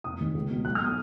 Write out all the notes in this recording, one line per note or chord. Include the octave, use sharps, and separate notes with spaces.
F1 D#6
D#2 D#3
C#2
B2
B1 F#6
F6
B2 D#6